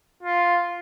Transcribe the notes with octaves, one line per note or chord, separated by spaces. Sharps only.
F4